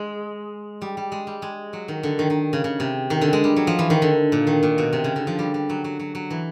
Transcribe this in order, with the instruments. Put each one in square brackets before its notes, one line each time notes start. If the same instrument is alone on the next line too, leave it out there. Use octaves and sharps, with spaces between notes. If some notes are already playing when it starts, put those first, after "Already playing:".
Already playing: [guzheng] G#3
G3
G3
G#3
G3
G#3
F#3
D#3
D3
D#3
D#3
C#3
C#3
C3
D#3
D3
G#3
G3
F#3
F3
E3
D#3
D3
A#2
D#3
A#2
B2
C3
C#3
D3
F3
G3
G3
F#3
F#3
F#3
F#3
E3